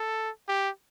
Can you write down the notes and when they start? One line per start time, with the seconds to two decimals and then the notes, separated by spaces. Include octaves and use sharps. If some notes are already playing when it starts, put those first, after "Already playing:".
Already playing: A4
0.48 G4